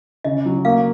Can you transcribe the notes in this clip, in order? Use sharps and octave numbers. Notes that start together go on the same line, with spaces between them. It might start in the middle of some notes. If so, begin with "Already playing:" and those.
C#3 D#5
F#3
A#3 F5